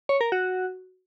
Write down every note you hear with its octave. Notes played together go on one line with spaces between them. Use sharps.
C#5
A#4
F#4